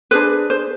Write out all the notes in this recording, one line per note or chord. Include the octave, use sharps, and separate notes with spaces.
D4 G#4 B4 C5
C5